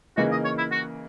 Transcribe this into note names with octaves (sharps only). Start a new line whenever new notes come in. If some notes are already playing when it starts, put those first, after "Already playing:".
C#3 E3 A#3 D#4 F#4
D#5
C#5
E4
F#4